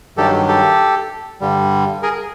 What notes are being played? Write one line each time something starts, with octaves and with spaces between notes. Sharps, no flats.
G2 D#3 F#3 G4 A4
G4 A4
G2 D3 G3
G#4 A#4